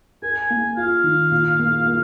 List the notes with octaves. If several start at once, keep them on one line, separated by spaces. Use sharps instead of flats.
A#4 G#5
A#3
F4 F5
D#3
A#2
A#3
A#3